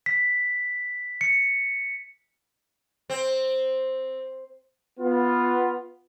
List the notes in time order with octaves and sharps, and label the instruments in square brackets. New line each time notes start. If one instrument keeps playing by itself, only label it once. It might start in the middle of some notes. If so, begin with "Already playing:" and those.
[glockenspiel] B6
C#7
[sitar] C4
[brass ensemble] B3 F4